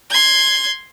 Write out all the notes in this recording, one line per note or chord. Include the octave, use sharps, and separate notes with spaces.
C6 G#6